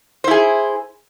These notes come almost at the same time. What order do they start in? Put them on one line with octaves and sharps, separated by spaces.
C5 E4 G#4